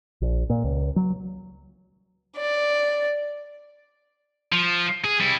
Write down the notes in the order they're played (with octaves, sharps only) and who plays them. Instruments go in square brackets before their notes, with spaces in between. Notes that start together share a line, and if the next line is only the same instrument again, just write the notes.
[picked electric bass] A#1
A#2
C#2
F#3
[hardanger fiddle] D5
[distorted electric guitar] F3
G#4
G3 E4